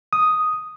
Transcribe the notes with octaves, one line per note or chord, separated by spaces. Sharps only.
D#6